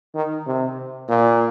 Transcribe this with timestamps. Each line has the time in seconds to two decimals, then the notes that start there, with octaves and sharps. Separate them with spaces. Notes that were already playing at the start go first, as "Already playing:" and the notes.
0.15 D#3
0.46 C3
1.09 A#2